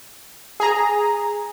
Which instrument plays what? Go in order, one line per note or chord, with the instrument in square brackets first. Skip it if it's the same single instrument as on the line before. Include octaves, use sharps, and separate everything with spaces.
[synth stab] G#4 A#5